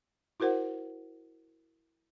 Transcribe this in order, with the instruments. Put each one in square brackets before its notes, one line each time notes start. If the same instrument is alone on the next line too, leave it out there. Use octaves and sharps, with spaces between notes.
[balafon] E4 F#4 A#4 C5 F#5